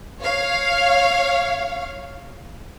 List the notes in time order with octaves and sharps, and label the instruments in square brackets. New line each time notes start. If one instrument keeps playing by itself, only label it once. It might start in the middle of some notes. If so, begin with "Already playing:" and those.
[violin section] C#5 F5